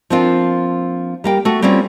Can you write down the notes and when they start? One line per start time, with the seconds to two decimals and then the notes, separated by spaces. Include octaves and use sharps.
0.10 F3 A#3 C4 D4 F4
1.24 G3 A#3 G5
1.45 A3 F#4
1.62 G3 A#3 C4 C#4 F4